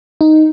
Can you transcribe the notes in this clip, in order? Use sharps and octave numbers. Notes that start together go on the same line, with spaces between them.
D#4